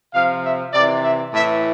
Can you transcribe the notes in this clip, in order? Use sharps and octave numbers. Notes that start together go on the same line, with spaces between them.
C3 F3 F5
E5
C3 E3 D5
E5
A2 E3 E5